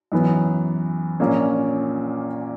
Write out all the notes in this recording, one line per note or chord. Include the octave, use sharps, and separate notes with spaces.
F#2 E3 B3
A#1 A#2 A#3 C#4